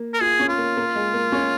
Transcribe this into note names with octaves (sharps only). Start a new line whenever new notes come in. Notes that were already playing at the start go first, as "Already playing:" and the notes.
Already playing: A#3
A#4
F4 G#4
C#4
F4
A#3
A#3
G#3
A#3
C#4